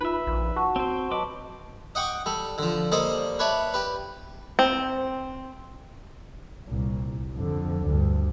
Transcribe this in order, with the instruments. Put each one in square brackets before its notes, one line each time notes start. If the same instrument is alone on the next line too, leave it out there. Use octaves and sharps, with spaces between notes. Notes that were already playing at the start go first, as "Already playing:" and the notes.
[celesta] D#4 F4 [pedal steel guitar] B4 E5
[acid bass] A#1
[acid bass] F#4 [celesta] F#5 A5 C#6
[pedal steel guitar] C4 C5
[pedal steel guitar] F#3 B4 D6 [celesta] D#5 A5
[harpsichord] D#5 F#5 G5 C#6 D6
G3 A4
D3 F3
G3 A#3 A4 C5 D5 D#5
B4 C#5 D5 E5 A5
G4 B4
[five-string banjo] C4
[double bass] C2 A#2
F2 D3
D2 G2